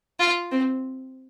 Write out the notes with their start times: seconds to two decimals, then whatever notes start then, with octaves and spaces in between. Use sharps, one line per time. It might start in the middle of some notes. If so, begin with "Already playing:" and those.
0.20 F4
0.51 C4